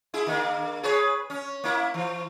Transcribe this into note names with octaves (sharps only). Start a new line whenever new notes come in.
E4 G#4
D3 A#3
G#4 B4 C#5
C#4
A#3 E4
E3